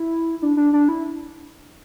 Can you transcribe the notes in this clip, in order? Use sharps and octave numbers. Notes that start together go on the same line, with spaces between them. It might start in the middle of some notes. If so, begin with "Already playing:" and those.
Already playing: E4
D4
D4
D4
E4